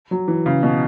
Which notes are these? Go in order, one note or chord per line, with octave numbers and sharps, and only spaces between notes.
F#3
E3
C#3
B2